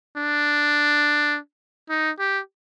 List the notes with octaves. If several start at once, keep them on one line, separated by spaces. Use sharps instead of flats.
D4
D#4
G4